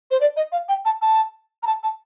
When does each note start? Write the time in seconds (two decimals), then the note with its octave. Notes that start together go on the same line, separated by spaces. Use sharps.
0.11 C5
0.21 D5
0.37 D#5
0.52 F5
0.69 G5
0.85 A5
1.02 A5
1.63 A#5
1.67 A5
1.83 A5